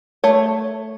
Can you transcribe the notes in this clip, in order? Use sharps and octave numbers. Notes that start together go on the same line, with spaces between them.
A3 C#5